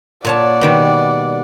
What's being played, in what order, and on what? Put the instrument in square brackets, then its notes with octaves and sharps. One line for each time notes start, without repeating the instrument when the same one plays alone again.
[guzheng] A#2 C#5 A5 [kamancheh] D5 F#5
[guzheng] B2 D#3 G3